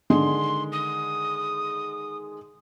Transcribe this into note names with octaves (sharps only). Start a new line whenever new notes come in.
D3 D#3 G#3 C6
D#6